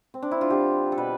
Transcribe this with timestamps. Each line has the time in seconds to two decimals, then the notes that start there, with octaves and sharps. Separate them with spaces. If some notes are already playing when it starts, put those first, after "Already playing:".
0.14 C4
0.22 D4
0.31 E4
0.41 F4
0.50 D3 G3 G4
0.92 A4
0.98 B2 G3 B4